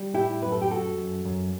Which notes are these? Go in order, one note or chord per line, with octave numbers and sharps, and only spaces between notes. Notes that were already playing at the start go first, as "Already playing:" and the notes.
Already playing: G3
A2 E4 G4
F#2 B4
A4
G4
F#2 F#4 A4
F#2
F#2